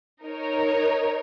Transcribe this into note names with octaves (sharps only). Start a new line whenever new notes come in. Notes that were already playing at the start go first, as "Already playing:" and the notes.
D#4 A#4 C#5